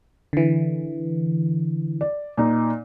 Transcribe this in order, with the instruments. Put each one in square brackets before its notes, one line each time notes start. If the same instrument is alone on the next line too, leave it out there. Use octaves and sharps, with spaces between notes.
[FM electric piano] D3 E3
[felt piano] D5
A#2 D#4